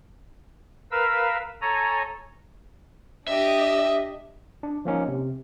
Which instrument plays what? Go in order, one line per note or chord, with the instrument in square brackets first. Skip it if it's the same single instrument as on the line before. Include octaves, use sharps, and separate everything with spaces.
[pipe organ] A#4 B4 F5 E6
A4 C#5 G#5 A#5
[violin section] D4 G4 D#5 [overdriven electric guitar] E5
[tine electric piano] D4
F3 A#3 C#4 D#4
C3